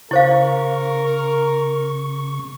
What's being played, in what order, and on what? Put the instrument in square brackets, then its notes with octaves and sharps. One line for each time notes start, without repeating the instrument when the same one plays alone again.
[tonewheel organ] C#3 C#6 [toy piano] E4 C5 F5 [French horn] A#4